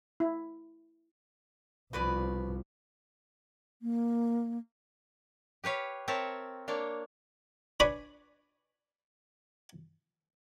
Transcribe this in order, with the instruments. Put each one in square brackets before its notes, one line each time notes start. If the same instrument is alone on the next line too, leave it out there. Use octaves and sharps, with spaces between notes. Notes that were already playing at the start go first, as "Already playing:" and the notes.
[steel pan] E4
[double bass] C2 F3 [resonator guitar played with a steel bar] B2 B4 D5
[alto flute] A#3
[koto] G4 B4 C#5 F5
C4 A#4 C#5 E5 A5
A#3 D4 C#5
[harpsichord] D4 B4 C#5 D5 G#5 B5